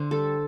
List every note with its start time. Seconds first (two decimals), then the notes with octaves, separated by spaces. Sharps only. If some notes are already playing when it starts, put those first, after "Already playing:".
Already playing: D3 C5
0.11 G3 A4